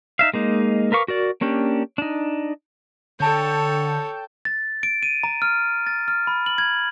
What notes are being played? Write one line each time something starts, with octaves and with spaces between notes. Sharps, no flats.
D#4 E5 F5
G#3 A#3 D#4
A#4 B4 F5 C#6 D6
F#4 A#4 D5
A#3 C#4 D4 G4
D4 D#4
D3 A4 C#5 G5 A5 G6
A6
D7
D#7
A#5
F6
A6
F6
B5
F#7
G#6